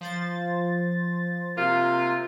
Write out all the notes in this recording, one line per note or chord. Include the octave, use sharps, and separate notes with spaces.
F3 C5 A6
C3 A#3 F4